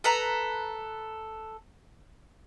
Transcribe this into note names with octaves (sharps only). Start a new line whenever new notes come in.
A4 B4 A#5